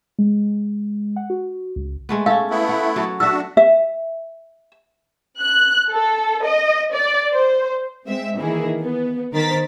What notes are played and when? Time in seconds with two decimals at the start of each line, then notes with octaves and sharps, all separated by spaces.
0.19 G#3
1.16 F#5
1.30 F#4
1.76 C#2
2.09 G#3 A3 B3
2.26 C#4 A4 F5
2.50 A3 B3 E4
2.69 F#5
2.96 F#3 A4
3.20 D4 F#4 A4 E5 E6
3.57 E5
5.42 F#6
5.91 A4
6.45 D#5
6.94 D5
7.34 C5
8.06 G#3 C4 E5
8.37 D#3 E3 A#3 E4 G#4
8.81 B3
9.33 D#3 A#4 C5 A6 B6